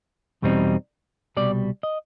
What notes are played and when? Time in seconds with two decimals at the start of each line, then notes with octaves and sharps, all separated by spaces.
0.42 E2 B2 G3 C4 D#4
1.37 C2 B2 G3 D5
1.83 D#5